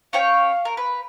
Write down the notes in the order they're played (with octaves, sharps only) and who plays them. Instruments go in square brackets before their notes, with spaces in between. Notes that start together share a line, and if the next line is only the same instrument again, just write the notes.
[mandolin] C#4 C#5 G5 [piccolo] F5
[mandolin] A#4
[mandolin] B4 [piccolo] B5